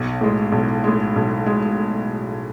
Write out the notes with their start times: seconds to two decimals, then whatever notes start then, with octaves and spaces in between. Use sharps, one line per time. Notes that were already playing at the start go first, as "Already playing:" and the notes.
Already playing: B1
0.21 A2 G#3
0.52 B1
0.84 A2 G#3
1.16 B1
1.46 G#3